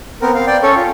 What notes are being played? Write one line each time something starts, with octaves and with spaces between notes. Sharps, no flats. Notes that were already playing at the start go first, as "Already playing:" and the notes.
B3 C4 A#4
C4 F5
D5 G5
C#4 A4 C#5
F4